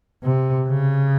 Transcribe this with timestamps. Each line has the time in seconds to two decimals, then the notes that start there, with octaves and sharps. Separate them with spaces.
0.23 C3
0.67 C#3